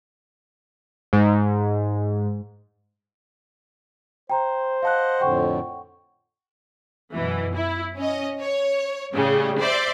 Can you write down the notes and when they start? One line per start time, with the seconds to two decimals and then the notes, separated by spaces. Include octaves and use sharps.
1.13 G#2
4.30 C5 G5 A#5
4.83 D#5 F5 F#5 A5 F#6
5.21 F2 A2 D3 F#5 G5 C#6
7.13 F#2 B2 E3
7.54 E4
7.97 C#4 D#5
8.41 C#5
9.13 A2 C#3 G3
9.60 C5 D5 E5 C6